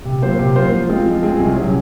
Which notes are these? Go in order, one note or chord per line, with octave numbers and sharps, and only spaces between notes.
C3
F#3 A#3 F4 C5
C3
F#3 A#3 F4 C5
F3
G#3 C4 F4 G#4
F3
G#3 C4 F4 G#4
C2
C3 F#3 C#4 G#4